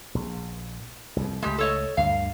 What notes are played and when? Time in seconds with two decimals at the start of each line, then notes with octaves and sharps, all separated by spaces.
0.15 A#1
1.16 C2 F2
1.42 C#2 G#3 A3 G4
1.58 A4 C#5 D#5
1.97 D2 G2 D3 F5